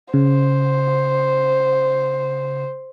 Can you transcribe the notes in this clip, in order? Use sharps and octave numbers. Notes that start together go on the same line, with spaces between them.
C#3 C5